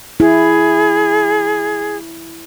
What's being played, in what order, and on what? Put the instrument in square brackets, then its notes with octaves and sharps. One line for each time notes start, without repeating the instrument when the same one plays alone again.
[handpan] E4 [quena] G#4